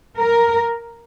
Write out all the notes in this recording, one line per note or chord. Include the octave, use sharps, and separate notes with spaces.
A#4